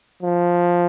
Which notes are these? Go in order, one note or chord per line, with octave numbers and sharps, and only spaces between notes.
F3